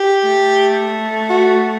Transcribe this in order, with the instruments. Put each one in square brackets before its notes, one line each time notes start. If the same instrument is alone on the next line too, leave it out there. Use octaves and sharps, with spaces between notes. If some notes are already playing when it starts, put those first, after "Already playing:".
Already playing: [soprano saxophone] G4
[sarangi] A3
[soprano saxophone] F#4